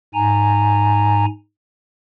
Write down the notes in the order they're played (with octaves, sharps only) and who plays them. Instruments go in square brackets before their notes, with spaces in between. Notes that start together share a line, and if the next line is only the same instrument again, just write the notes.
[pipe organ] G#2 G#5 A#5